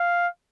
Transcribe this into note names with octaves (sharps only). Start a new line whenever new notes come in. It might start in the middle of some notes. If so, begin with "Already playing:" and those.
Already playing: F5